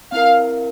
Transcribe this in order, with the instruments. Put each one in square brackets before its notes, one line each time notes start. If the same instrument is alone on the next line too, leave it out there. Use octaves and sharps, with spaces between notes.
[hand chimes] C4 E4 A#4 [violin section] F5